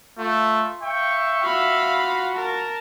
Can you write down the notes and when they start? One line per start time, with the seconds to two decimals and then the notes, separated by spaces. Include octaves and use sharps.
0.19 A3 F4
0.82 E5 F5 G5 C#6
1.43 F4 F#4 F5 B5
2.35 A#4 A5